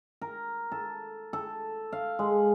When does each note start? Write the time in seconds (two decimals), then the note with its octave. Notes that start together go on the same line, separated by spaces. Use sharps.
0.22 A#4
0.72 A4
1.33 A4
1.93 F5
2.19 G#3